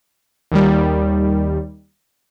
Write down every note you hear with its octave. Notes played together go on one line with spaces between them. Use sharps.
D#2 D#3 G3